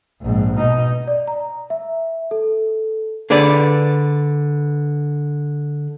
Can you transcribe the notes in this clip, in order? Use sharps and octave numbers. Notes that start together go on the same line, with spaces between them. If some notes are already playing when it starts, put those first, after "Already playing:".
A#1 G#2
B2 D#4
D5
A#5
E5
A4
D3 G#4 B4 D5